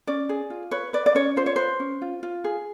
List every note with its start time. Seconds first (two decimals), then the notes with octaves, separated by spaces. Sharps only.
0.07 C#4 D5
0.29 G#4
0.50 F4
0.71 B4 C#5
0.93 B4 D5
1.06 D5
1.15 C#4 C#5
1.36 F4 C5
1.46 C#5
1.56 B4 C5
1.80 C#4
2.02 F4
2.23 F4
2.44 G#4